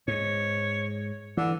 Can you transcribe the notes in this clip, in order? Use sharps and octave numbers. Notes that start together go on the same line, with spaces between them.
G#2 C#5
D3 E3